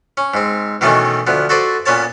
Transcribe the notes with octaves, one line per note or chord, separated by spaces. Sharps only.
C#4
G#2 C4
B2 D#3 E3 A3 B3 C#4
D2 F3 B3
F#4 A4 B4 C5 D5
A#2 B3 C#4 C#5 A5